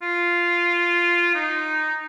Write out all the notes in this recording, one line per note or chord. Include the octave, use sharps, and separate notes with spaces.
F4
D#4